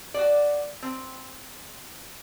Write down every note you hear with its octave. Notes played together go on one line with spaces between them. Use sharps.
F#4 D5
C4